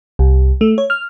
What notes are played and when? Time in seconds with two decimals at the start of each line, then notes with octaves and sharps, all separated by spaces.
0.19 C2
0.61 A3
0.78 C#5
0.90 F6